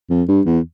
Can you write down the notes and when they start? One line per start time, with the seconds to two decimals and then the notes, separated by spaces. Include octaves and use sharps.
0.10 F2
0.28 G2
0.46 E2